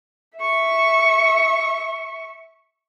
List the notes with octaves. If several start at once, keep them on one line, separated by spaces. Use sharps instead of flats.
E5 C#6